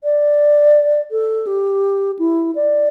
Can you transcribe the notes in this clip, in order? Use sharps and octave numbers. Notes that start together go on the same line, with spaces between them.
D5
A4
G4
E4
D5